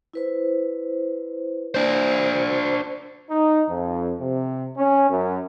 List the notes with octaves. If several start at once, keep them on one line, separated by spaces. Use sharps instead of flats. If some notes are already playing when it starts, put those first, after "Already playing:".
E4 B4 C5
D4 C5
D#4
F2
C3
C#4
F#2